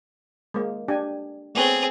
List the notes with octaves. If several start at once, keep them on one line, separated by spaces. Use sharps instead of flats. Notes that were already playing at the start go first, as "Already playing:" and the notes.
G#3 A#3
D4 G4 G#5
A3 B3 C4 G#4 C#5